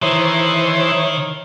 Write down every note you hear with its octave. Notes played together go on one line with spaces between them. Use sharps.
D#3 E3 C5 C#5